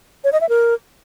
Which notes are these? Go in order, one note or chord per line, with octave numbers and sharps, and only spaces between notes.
C#5
D#5
E5
A#4